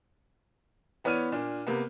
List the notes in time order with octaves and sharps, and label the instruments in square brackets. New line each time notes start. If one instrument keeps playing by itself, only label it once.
[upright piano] E3 B3 C#5 D5 F6 D#7
A#2 D4
C3 A#3 B3